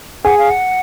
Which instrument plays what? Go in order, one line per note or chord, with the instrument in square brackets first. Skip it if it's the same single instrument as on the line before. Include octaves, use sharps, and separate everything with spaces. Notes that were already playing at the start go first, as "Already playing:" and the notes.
[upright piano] G#4 [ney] F#5
[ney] F5
F#5